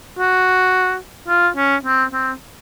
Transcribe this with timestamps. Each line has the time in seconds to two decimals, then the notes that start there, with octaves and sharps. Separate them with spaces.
0.18 F#4
1.29 F4
1.57 C#4
1.85 C4
2.12 C4